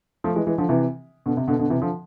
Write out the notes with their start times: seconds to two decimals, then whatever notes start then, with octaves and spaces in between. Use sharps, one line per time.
0.24 F3 A3
0.35 E3 G#3
0.47 E3 G#3
0.58 D3 F3
0.69 C3 E3
1.26 B2 D3
1.37 C3
1.48 B2 D3
1.59 B2 D3
1.70 C3 E3
1.82 D3 F3